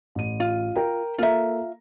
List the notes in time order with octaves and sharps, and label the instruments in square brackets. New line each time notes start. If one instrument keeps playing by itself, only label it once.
[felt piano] A1 D#7
[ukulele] F4
[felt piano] A#4 G5 A#5
[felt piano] A#3 A4 A#5 [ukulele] F4 E5